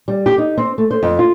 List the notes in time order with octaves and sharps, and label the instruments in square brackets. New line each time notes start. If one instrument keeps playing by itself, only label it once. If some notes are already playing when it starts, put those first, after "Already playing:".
[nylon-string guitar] G3
G4
D#4
C4
A3
C5
F2
F4